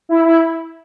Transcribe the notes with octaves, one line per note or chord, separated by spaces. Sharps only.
E4
E4